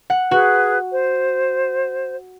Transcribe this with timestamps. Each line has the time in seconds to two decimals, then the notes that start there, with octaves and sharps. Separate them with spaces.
0.10 F#5
0.31 F#4 G#4 B4
0.91 C5